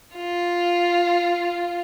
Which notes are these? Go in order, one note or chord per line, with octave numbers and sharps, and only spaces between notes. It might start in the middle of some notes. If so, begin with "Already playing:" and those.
F4